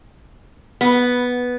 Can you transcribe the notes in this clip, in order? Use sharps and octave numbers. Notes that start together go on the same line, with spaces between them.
B3